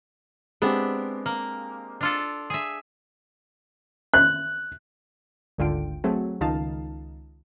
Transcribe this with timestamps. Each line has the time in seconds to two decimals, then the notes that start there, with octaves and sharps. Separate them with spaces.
0.62 G#3 B3 C4 D4 G4 E5
1.26 A#3
2.01 D4 F4 A4
2.50 G#4 E5
4.14 F#6
5.58 G#1 D2 D3 F4 G5 D7
6.04 F#3 A3 C4 G#4
6.41 C#2 D#3 D#4 F4 F5 A5